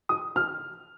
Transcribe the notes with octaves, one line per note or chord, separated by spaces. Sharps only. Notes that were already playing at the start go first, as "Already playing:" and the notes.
D#6
F6